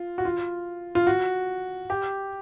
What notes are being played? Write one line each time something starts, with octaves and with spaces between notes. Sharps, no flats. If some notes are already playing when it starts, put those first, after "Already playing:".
Already playing: F4
F#4
F4
F4
F#4
G4